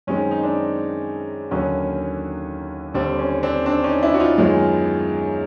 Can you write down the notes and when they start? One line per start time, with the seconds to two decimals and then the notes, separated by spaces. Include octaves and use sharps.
0.07 F#2 D#3 G#3 C4 C#4
0.31 D#4
0.43 C4 D4
1.51 D#2 D3 F#3 A#3 C#4
2.94 D#2 D3 G3 C4
3.19 C#4
3.43 C4 D4
3.66 C4 D4
3.84 C#4 D#4
4.03 D4 E4
4.14 F#4
4.20 D#4 F4
4.38 F#2 D#3 G#3 B3